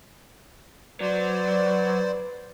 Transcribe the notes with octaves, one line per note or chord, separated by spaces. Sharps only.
F#3 B4 C5 D5